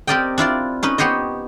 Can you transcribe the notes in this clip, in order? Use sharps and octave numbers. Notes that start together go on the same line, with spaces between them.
C4 G4 A#4 D5 D#5 G5
D4 E4 F4 D5
C#4 D#4 B4
B3 G4 C5 C#5 D#5